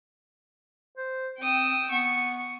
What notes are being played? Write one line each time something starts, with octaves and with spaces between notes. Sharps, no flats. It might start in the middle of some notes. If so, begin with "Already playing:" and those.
C5
C4 G5 D#6 E6
B3 C#6